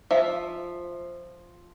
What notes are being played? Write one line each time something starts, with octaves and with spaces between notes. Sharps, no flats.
F3 E5